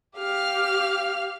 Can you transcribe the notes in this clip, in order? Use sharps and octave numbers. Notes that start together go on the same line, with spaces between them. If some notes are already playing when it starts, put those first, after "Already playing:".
G4 F5 F6